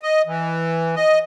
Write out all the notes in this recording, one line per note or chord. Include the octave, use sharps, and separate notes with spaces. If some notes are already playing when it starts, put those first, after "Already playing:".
D#5
E3
D#5